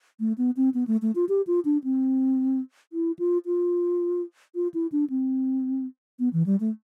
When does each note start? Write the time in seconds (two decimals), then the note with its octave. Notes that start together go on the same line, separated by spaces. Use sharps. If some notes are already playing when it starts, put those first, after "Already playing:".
0.20 A3
0.38 B3
0.57 C4
0.74 B3
0.87 A3
1.02 A3
1.15 F4
1.29 G4
1.47 F4
1.65 D4
1.84 C4
2.93 E4
3.19 F4
3.46 F4
4.55 F4
4.74 E4
4.92 D4
5.10 C4
6.19 B3
6.33 E3
6.46 G3
6.60 A3